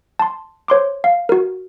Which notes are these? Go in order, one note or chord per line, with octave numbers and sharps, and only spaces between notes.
A5 C6
C5 C#5 C6 D6
F5
F#4 A#4